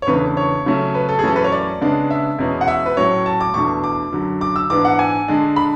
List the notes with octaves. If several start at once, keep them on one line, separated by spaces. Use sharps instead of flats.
C#5
E2 C#3 E3 A3 D4 B4
C#5
C#3 F#3 A3 C#4
B4
A4
G#4
F#2 E3 A3 C#4 A4
B4
C#5
D5
C#3 G#3 B3 D4
E5
E2 B2 G#3 C#4
F#5
E5
B4
A2 F#3 C#4 C#5
A5
D6
E2 B2 A3 D4 C#6
D6
F#2 D3 F#3
D6
E6
G#2 E3 B3 D4 D6
F#5
G#5
D3 G#3 D4
B5